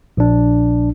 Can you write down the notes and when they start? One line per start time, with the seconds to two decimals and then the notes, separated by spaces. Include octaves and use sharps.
0.17 A#1 D4